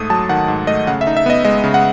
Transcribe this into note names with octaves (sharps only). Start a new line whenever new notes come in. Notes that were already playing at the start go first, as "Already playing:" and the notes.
Already playing: G#2 A3 D#6
F#3 A5
D#3 F#5
G#2
A3 D#5
C#3 F#5
E5
D#4
E5
B3 D#5
G#3 D#5
C#3
F#5